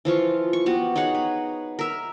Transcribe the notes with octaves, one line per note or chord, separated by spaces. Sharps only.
E3 F3 F4 C#6
C#6
B3 F#4 G4
D#4 G#4 C#5 F#5
B4
A#4 E5